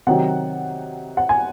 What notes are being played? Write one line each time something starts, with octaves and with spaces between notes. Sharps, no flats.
C3 D#3 F#3 F#5
F#5
G#5